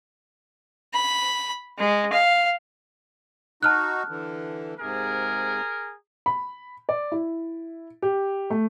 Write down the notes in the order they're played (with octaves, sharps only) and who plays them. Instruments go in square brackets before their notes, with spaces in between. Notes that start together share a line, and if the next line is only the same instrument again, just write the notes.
[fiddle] B5
G#3
F5
[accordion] D#4 F#4 [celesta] A5 F6 F#6
[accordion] D3 E3
[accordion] G#2 C3 [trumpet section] G#4 A#4
[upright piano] B5
D5
E4
G4
A3